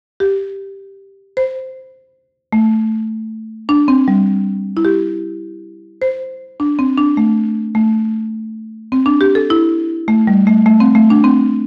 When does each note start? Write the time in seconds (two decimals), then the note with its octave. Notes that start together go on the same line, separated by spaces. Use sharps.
0.20 G4
1.37 C5
2.53 A3
3.69 D4
3.88 C4
4.08 G3
4.77 E4
4.85 G4
6.02 C5
6.60 D4
6.79 C4
6.98 D4
7.17 A3
7.75 A3
8.92 C4
9.06 D4
9.21 G4
9.35 A4
9.50 E4
10.08 A3
10.27 G3
10.47 A3
10.66 A3
10.80 C4
10.95 A3
11.10 D4
11.24 C4